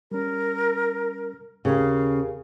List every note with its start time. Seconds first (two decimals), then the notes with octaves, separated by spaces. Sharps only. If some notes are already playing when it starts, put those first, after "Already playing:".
0.11 G3 C#4 A#4
1.65 D#2 C#3 G4 A#4 F5